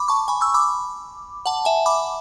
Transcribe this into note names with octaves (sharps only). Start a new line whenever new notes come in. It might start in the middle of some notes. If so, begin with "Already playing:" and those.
Already playing: B5 D6
A5 C#6
G#5 B5
C#6 E6
B5 D6
F#5 A5
E5 G#5
B5 D6